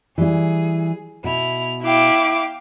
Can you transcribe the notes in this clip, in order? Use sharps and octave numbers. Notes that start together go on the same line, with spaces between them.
E3 G3 E4 G#4
B2 E4 F7
E4 F5 G5 D6